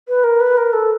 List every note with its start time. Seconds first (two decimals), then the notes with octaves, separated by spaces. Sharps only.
0.08 B4
0.24 A#4
0.40 B4
0.57 A#4
0.73 A4